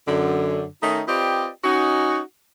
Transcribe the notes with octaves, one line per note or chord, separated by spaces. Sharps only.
F#2 D3
D#3 A3 C#4 D#4
C4 F4 G4 B4 D5 D#5
C#4 D#4 F#4